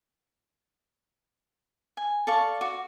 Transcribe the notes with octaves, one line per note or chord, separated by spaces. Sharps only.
G#5
A4 D5 F5 C#6
F#4 D6